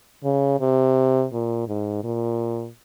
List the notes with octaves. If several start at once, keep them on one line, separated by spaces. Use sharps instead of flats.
C#3
C3
A#2
G#2
A#2